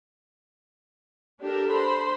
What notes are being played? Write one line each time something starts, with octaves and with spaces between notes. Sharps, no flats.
D4 G4 A4 A#4
C5 B5 C6